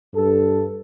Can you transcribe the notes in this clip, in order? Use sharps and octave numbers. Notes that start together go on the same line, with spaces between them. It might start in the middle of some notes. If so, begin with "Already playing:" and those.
G2 A4